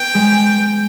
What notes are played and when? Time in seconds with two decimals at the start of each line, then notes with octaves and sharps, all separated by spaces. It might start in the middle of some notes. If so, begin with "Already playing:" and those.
Already playing: B3 G5
0.15 G#3